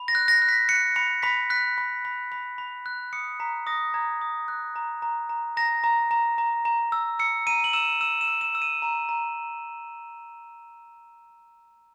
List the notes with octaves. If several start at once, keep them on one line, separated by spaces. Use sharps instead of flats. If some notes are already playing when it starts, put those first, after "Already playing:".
Already playing: B5
A#6
F#6
A#6
F#6
B6
F#6 C#7
B5 C#7
B5 B6
F#6 B6
B5
B5
B5
B5
F#6
D#6 C#7
A#5 B6
D#6 A#6
A#5 G#6
D#6
F#6
A#5
A#5
A#5
A#5 A#6
A#5
A#5
A#5
A#5
E6
E6 C#7
A#5 D#7
F#7
E6 E7
E6 E7
E7
E6
E7
E6
D#7
A#5
A#5